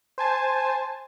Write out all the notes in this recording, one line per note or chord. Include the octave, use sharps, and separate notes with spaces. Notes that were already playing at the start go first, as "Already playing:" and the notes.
C5 G#5 A5